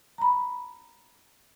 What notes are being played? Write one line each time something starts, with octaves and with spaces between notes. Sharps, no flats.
A#5 B5